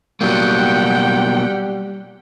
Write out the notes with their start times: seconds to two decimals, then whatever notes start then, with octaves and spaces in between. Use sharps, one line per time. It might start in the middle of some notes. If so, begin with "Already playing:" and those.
0.21 B2 F#3 G3 A#3 F#5 G5